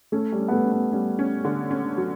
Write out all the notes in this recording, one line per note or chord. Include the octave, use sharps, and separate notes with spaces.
A3 C#4
G3
C#4
B3
A3
C#4
B3
G3 C#4
C#4
D3
C#4
F#3